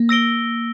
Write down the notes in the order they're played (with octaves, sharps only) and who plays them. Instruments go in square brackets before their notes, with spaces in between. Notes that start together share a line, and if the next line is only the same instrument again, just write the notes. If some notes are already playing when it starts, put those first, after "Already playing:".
Already playing: [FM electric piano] A#3
[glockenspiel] E6 A#6 D7 G7